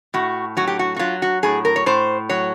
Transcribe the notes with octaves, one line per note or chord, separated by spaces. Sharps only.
A2 F#4
F#3 F#4
G4
F#4
F#4
F#3 F4
F#4
A2 G#4
A#4
C#5
A2 C5
F#3 C#5